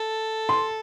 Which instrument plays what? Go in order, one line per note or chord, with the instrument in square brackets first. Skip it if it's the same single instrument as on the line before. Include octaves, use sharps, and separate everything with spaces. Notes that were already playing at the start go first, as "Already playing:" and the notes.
Already playing: [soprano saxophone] A4
[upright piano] C6